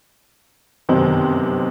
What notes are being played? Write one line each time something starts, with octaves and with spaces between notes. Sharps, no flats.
G1 F#2 C3 D#3 D#4 C5